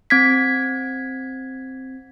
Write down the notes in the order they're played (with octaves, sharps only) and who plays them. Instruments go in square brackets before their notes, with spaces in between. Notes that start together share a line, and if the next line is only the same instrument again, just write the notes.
[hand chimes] C4 G#6 B6